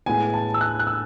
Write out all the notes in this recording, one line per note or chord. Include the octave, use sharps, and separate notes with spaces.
A2 G#3 B3 G#5
A5
E6
F#6
F#6
E6